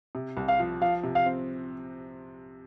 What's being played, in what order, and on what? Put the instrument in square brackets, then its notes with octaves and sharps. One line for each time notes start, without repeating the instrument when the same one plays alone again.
[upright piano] C3
C2
[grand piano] F5
[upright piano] F3
[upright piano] F3 [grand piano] F5
[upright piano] C3
[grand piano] F5
[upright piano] C4